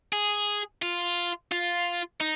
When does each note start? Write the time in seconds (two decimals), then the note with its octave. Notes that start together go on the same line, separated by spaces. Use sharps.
0.13 G#4
0.82 F4
1.52 F4
2.21 D#4